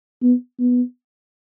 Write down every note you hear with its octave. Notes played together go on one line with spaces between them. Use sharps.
B3
B3